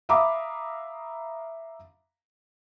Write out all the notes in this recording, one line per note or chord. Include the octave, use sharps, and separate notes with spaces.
E5 F5 A#5 B5 D6 D#6